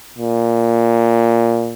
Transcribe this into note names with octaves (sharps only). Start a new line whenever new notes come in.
A#2